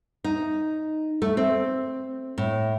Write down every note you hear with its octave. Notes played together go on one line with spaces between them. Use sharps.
D#4
A3
C4
A2